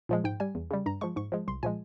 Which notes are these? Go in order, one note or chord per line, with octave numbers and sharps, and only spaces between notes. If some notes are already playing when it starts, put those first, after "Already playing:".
A#2 F3 G#3
G#2 G5
G3 G#5
E2
C#3 G3
G2 A#5
F3 G#3 C#6
G#2 C#6
F3 G#3
C2 C6
A#2 F3 G#3 G#5